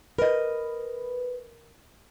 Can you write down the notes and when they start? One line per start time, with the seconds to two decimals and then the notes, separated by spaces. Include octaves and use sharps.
0.18 A#4 B4 D#5